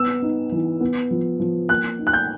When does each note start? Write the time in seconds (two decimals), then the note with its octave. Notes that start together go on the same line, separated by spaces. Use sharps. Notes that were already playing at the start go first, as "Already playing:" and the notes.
Already playing: B3 E6
0.22 D#4
0.52 E3
0.80 B3
1.11 F3
1.40 F3
1.69 A#3 F#6
1.99 D#4
2.07 F#6
2.13 G6